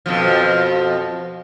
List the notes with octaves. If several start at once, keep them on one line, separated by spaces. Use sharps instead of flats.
F2 B2 F3